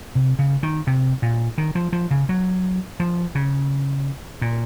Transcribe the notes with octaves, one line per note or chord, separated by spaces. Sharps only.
C3
C#3
D#3
C3
A#2
D#3
F3
F3
C#3
F#3
F3
C#3
A#2